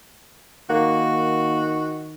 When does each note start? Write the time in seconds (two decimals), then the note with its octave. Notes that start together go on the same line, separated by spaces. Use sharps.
0.70 D#3 A#3 F#4